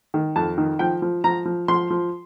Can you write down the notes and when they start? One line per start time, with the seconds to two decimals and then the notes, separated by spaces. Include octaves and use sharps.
0.14 D#3
0.36 F2 A5
0.58 D#3
0.79 F3 G5
1.02 F3
1.24 F3 A#5
1.45 F3
1.68 F3 C6
1.90 F3